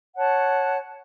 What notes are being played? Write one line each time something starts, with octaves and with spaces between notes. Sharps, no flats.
C#5 F#5 A5